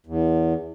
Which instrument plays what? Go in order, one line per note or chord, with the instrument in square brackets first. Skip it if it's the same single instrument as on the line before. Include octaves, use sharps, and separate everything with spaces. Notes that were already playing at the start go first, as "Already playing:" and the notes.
[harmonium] E2